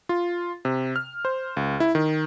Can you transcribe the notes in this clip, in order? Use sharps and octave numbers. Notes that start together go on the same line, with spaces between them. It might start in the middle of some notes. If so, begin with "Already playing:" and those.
F4
C3
F6
C5
C#2
E4
D#3